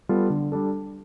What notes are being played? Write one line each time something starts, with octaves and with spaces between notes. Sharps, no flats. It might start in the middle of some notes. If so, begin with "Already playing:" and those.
G3 B3 F4 A4
D3
G3 D4 A4